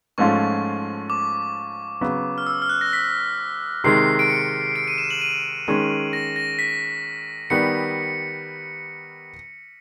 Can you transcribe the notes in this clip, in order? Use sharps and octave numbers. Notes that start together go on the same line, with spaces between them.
G#2 F3 A3 C#4 F4 C#6
D6
C#3 F#3 B3
F6
E6
F6
F#6
A#6
B6
C3 D#3 G#3 C7
D7
C#7
D7
D#7
E7
F#7
D#7
D#3 G#3 C#4
A#6
A#6
B6
D#3 G3 B3 C#7